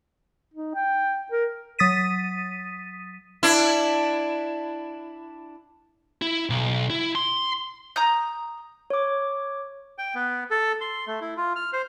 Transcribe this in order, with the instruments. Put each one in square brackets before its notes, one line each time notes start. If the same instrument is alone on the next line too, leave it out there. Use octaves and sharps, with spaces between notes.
[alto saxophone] D#4
G5
A#4
[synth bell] F#3 D#6 A6 B6 D#7
[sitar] D4 E4
[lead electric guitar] E4
B1
E4
C6
[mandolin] A#5 D#6 G6
[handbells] C#5 D6
[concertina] G5
B3
A4
C6
A3
E4
F4
F6
C5